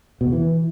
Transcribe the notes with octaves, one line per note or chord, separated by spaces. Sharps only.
B2
E2
E3